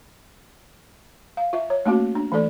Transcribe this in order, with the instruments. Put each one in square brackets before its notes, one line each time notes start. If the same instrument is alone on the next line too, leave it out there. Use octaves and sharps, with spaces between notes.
[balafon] F5
F4 E5
C#5
A3 A#3 C#4 F#4
D4
E3 A3 A4 D5